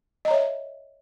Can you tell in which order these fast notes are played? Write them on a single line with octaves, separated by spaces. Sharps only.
D#5 A#5 C#5 E5